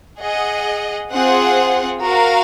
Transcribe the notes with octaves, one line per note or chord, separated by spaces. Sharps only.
G#4 D#5 F#5
C4 F4 G#4 C5 F#5
F#4 A#4 F5